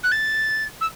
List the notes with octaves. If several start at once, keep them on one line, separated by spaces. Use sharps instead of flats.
F#6
A6
E6